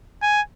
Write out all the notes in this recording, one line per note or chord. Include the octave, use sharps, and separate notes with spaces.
G#5